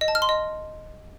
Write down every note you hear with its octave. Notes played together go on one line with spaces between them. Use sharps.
D#5
A5
F6
C6
D#5